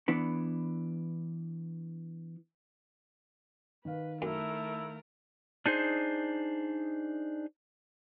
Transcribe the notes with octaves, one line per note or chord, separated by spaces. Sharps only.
E3 B3 D4
D#3 B4 F5
F#2 A3 E4 A#4
D4 D#4 G#4 C5